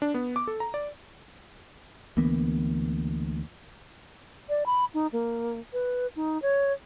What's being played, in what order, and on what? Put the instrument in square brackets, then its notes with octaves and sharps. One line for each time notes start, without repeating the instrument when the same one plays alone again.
[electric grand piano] D4
B3
D6
A4
A#5
D5
[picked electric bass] D2 E3 A#3 B3
[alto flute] D5
B5
D#4
A#3
B4
D#4
C#5